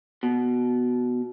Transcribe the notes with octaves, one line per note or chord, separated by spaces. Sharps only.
B2